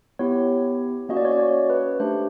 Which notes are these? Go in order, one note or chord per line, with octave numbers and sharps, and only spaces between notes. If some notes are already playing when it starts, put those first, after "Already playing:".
B3 E4 G4 C#5
A#3 C#4 F#4 D#5
D5
C#5
D5
C#5
B4
A3 D4 G4 C5